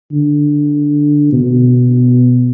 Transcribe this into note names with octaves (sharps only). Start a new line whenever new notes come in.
D3
B2